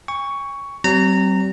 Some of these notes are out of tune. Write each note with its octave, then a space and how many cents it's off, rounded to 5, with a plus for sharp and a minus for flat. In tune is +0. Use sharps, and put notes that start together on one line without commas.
G#5 -45 C#6 +10
G3 -45 C4 +0 A#5 -20